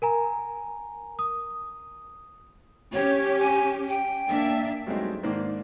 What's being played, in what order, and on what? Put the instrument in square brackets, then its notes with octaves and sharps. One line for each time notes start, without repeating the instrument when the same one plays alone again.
[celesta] A#4 G#5 A#5
D#6
[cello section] C#4 G4 [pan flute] C#5
[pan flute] G#5
G5
[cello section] A#3 D4 E5
[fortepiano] G2 F#3 G#3 A3 C4 D#4
G#2 D#3 A#3 D4 C5 D5